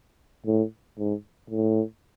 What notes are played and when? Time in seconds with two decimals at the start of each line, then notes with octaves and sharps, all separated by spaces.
0.46 A2
0.98 G#2
1.50 A2